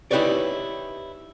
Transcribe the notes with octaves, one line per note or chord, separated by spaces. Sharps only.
D#4 E4 G4 B4 C#5 D5